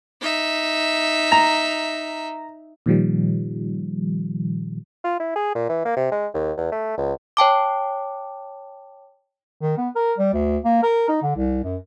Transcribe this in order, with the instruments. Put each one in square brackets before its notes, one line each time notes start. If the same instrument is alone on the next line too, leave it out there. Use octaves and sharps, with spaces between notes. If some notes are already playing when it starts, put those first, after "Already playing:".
[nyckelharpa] D#4 E5
[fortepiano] A#5
[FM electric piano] A#2 D#3 F3 G3
[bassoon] F4
E4
G#4
A#2
E3
A#3
C3
G#3
D#2
E2
A3
C#2
[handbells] C#5 G5 A5 D6
[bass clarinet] D#3
B3
A#4
G3
D2
A#3
A#4
D#4
D3
C2
F#2